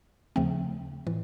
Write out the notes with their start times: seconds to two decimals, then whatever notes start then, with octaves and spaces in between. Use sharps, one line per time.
0.36 D#2 C#3 F3 A3 C4
1.07 A2 E3